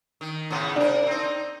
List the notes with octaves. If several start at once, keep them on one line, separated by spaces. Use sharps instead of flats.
D#3
A2 C#3 B3
C3 D4 A#4
C4 D#4